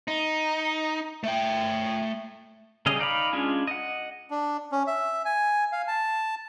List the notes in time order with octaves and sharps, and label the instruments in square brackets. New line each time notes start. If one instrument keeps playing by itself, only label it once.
[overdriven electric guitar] D#4
A3 G5
[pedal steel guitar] C#3 G3 C#4 G#4 D#5
D#4 D5 F5 B5
G#3 C#4 D4 F4 G#4
D#5 F#5
[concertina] D4
C#4
E5
G#5
F5
A5